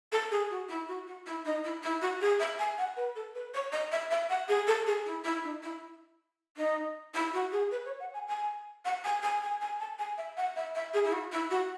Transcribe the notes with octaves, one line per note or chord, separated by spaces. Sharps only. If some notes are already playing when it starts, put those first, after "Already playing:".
A4
G#4
F#4
E4
F#4
F#4
E4
D#4
E4
E4
F#4
G#4
E5
G#5
F#5
B4
A4
B4
C#5
D#5
E5
E5
F#5
G#4
A4
G#4
E4
E4
D#4
E4
D#4
E4
F#4
G#4
B4
C#5
F#5
G#5
G#5
F#5
G#5
G#5
G#5
G#5
A5
G#5
E5
F#5
E5
E5
G#4
E4
F#4
E4
F#4